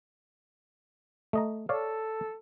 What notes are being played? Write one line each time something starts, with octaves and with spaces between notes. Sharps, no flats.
A3 D#5 A#5
A4 C#5 D5 F5